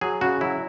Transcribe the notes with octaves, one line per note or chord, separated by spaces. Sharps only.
F#3 G#4
C#3 F#4
F#3 E4